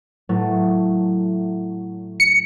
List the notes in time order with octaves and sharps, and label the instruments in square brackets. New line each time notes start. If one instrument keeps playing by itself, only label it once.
[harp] A2 F#3 A3
[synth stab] C#7